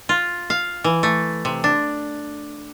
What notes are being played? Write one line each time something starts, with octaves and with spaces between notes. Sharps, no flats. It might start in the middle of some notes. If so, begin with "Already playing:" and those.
F4
F5
E3
A3
C3
D4